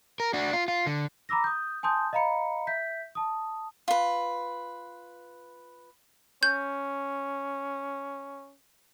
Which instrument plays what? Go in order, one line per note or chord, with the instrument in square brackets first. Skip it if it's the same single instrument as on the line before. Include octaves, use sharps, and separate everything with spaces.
[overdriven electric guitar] A#4
D4 F#4
F4
F4
D3
[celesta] A#5 B5 D6 E6 A#6
D#6 G6
G#5 A5 C6 D#6 G6
D#5 F5 A#5 B5 C#7
E5 G6 B6
A5 D#6
[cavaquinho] F4 B4
[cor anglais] C#4 [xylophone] G6